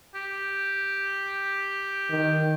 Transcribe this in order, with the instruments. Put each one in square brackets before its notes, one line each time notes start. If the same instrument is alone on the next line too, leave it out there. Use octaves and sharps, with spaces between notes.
[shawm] G4
[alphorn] D#3